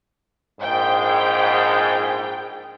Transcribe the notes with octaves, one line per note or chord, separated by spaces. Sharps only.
A#1 G#2 G5